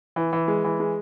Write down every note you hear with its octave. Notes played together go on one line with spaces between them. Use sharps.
E3
E3
G#3
E3
G#3